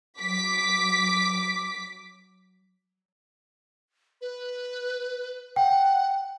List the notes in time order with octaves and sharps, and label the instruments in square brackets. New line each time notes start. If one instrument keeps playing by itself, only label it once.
[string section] F#3 D6 B6
[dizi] B4
[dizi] F#5 [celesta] G5